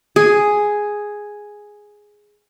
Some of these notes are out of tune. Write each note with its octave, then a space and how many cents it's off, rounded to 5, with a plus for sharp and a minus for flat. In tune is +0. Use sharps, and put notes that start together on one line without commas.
G#4 +0